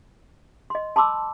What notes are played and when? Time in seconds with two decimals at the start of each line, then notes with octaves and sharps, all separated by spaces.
0.70 D#5 C6
0.96 A5 B5 C6 D6 E6